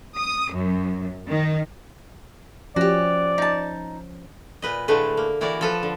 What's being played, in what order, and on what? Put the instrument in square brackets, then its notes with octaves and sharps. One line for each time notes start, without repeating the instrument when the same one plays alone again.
[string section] D#6
F#2
D#3
[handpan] F3 C#4 [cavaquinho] F#4 G4 [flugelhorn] D5
[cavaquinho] D#4 A5
[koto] A#2 B4 D#5
A2 D3 G#3 A3 B4
A#3
E3 E4 F#4 A#4 D5
F3 A4 B4
D3